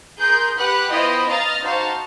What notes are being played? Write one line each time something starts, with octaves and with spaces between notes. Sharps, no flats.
G#4 A#4 C6 G6
G4 B4 F#5 B5 F#6
B3 E4 F4 C5 D#5 G5
D#5 F5 A#5 F6 A6
D#4 F#4 C5 F5 A5